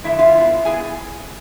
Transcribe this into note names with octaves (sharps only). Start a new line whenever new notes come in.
F2 D3 G#3 E4 E5
F4 F5
B2 B3 E4
B2 B3 E4 G#4 G#5